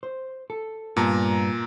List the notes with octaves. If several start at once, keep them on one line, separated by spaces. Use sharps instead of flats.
C5
A4
G2 A#2 B3 A5 A#5